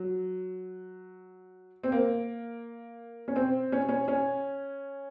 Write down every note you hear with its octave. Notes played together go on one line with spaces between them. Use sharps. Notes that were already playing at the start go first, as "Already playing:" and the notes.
Already playing: F#3
C4
A#3
C#4
C4
C#4
C#4
C#4